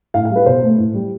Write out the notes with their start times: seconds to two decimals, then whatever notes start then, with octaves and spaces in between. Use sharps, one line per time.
0.14 A2 F5
0.25 F5
0.30 G3
0.36 B4
0.46 B2 C5
0.62 A3
0.78 A2
0.94 G3